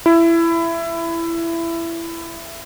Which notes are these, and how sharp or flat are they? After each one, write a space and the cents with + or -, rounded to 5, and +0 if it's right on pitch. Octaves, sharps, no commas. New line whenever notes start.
E4 +20